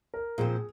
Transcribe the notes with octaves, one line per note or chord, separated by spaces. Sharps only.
A#4
A#2 F3 C4 G#4